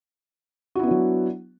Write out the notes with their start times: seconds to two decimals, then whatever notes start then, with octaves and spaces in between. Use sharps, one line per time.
0.75 F#4
0.79 E4
0.83 B3
0.87 D4
0.91 F#3